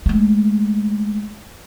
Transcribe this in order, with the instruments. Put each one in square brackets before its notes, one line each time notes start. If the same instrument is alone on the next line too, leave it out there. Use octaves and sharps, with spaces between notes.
[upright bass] G#3 A3